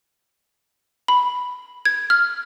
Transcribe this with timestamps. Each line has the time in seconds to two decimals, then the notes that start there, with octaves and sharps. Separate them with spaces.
1.08 B5
1.85 G#6
2.10 F6